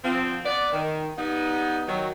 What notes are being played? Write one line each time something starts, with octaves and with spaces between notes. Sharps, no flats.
D3 F3 C4
B3 D5
D#3
G3 B3 D#4
D#3 F#3